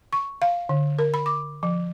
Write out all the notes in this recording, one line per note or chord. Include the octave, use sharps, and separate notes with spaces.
C#6
F5
D3
A#4
B5
D6
F3